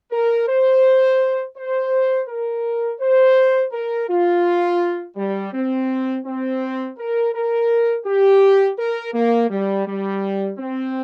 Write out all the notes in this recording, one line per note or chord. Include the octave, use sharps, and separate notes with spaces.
A#4
C5
C5
A#4
C5
A#4
F4
G3
C4
C4
A#4
A#4
G4
A#4
A#3
G3
G3
C4